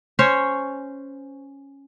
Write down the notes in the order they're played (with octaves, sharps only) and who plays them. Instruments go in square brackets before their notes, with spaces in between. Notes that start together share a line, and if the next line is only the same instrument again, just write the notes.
[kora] C#4 C5 C#5